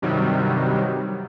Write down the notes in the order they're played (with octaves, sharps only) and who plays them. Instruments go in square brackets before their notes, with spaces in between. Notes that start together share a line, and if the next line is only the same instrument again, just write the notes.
[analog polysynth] G2 C3 D#3 F#3 G3